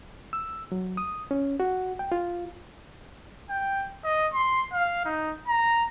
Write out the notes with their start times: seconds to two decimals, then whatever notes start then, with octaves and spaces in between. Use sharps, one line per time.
0.33 E6
0.72 F#3
0.97 D#6
1.31 C#4
1.60 F#4
1.99 G5
2.12 F4
3.49 G5
4.04 D#5
4.34 C6
4.73 F5
5.05 D#4
5.48 A#5